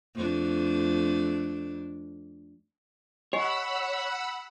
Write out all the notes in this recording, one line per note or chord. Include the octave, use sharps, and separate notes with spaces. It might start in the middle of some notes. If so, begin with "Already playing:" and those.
F2 A3 D4
G4 C#5 D#5 F#5 G#5 B5 E6